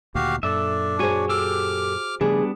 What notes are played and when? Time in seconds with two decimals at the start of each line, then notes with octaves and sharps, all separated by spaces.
0.15 D2 A#2 D#3 F#4 G4 F5
0.43 F#2 A#2 D4 A4 E5
0.99 F#4 G#4 C5 C#5 G#5
1.29 G4 A4 D6 E6 F6
2.21 C#3 F3 G3 A3 B3 D4 G#4